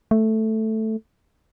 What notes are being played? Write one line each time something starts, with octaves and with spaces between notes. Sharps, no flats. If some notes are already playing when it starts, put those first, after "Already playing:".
A3